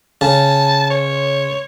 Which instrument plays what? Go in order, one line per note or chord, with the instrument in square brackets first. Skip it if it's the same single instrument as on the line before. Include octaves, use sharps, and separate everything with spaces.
[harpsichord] C#3 [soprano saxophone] A5
[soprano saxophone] C#5